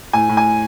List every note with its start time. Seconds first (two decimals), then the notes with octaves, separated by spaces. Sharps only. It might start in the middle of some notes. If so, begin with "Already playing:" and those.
0.13 A2 G#5
0.29 A2
0.37 G#5